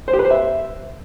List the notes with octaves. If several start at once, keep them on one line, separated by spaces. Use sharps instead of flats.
C5
G4
B4
C5
E5